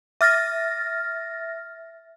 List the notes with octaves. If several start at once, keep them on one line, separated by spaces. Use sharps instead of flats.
E5 F6 A6 A#6